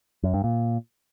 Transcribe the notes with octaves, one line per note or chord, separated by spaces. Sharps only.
F#2
G2
A#2